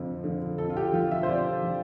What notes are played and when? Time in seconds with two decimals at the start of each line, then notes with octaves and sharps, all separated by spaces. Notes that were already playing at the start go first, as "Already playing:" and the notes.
Already playing: F2 D3 F3
0.24 D3 F3
0.58 F2 A4
0.70 F4
0.77 G4
0.93 D3 F3 F4
1.11 E5
1.23 C5
1.29 F2 D5
1.63 D3 F3